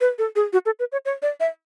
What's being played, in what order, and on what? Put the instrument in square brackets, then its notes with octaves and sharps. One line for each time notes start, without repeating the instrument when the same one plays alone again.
[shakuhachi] B4
A4
G#4
F#4
A4
B4
C#5
C#5
D5
E5